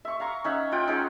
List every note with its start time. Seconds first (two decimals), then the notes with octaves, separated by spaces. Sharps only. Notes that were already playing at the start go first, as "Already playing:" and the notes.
0.05 E5 C#6
0.20 F5 A#5 C#6
0.44 C#4 D#4 E5 F#5
0.72 F4 F#5 G5
0.88 G#3 C#4 D#4